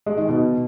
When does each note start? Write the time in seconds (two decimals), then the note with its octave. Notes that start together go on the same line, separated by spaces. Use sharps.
0.06 G#3
0.17 D#3
0.29 B2